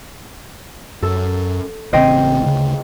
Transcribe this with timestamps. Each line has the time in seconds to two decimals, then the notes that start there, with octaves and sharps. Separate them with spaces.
1.03 F#2 A4
1.93 A1 C#3 C4 C5 D#5 G5
2.42 D2 C#3